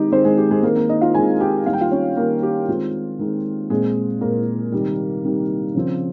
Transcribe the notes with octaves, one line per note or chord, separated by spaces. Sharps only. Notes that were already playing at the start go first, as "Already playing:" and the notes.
Already playing: D#3 G#3 C4 D#4 G4 D#5
D#3 G#3 C4 C5
G#3 G#4
G4
G#3 G#4
D#3 G#3 A#3 C4 A#4
A#3 A#4
D#4 D#5
F4 F5
D#3 G#3 C4 G#4 G#5
G4 G5
D#3 G3 A#3 F5
G5
F4 F5
C#4 C#5
D#3 G3 A#3 A#4
G4
D#3 G#3 C4 F4
D#3 G#3 C4
A#2 G#3 C4 G#4
A#2 G#3 A#3 C4 A#4
C3 D#3 G3
C3 D#3 G3
C#3 F3 C4